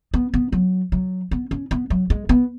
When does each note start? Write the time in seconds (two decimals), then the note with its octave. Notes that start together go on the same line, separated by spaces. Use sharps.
0.14 B3
0.34 B3
0.52 F#3
0.92 F#3
1.31 B3
1.51 C#4
1.71 B3
1.90 F#3
2.10 G#3
2.29 B3